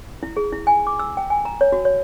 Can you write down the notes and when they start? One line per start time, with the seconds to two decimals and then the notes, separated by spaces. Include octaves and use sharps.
0.23 E4
0.37 G#4
0.52 E4
0.67 G#5
0.87 D6
0.99 E6
1.17 G5
1.30 G#5
1.45 A#5
1.61 C#5
1.72 F#4
1.85 C#5